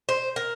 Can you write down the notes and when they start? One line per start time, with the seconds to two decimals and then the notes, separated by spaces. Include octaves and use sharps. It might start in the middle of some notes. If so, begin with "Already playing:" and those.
0.09 C5
0.36 A#4